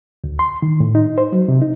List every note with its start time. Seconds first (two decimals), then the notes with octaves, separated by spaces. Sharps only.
0.24 D2
0.39 C6
0.62 D#3
0.80 A2
0.95 D#4
1.18 C5
1.32 F#3
1.48 C3
1.62 D#4